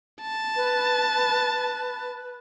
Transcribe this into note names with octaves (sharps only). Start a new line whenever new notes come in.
A5
B4